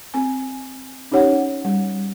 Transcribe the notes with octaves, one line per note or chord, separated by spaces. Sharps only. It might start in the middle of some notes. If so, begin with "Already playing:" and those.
C4 G#5
C#4 D#4 G4 C#5 F#5
G3